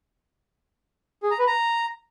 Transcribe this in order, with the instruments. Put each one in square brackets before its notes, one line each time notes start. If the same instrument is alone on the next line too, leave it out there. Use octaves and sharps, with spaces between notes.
[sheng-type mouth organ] G#4
A#5
B4
A#5